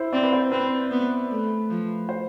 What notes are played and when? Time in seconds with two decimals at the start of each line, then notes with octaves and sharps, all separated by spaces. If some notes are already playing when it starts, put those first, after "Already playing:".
Already playing: E4 C5
0.13 C4 D5
0.23 B4
0.33 C5
0.52 C4 B4
0.91 B3
1.30 A3
1.70 F3
2.09 C5